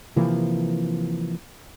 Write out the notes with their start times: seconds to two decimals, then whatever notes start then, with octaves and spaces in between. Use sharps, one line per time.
0.16 C3 E3 F3 A#3